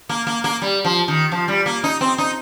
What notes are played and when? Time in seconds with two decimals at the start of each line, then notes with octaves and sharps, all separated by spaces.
0.09 A#3
0.27 A#3
0.44 A#3
0.62 G3
0.85 F3
1.08 D#3
1.32 F3
1.48 G3
1.66 A#3
1.84 D#4
2.01 C4
2.18 D#4